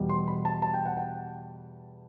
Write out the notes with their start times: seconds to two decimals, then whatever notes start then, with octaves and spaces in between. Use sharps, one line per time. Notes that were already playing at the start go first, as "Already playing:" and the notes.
Already playing: E2 B2 G3
0.09 C6
0.28 B5
0.45 A5
0.62 A5
0.74 G5
0.86 F#5
0.97 G5